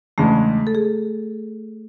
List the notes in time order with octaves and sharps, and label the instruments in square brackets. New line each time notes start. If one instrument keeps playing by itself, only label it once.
[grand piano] E2 C#3 G#3 D4 [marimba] A3
[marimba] A4
G#4